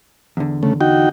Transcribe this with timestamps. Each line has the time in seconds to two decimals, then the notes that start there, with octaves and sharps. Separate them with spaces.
0.37 E2 D3
0.63 C#3 A3
0.81 D#4 F#4 G5